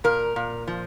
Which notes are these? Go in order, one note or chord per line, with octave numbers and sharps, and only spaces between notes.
A#2 A#4
A#2
F3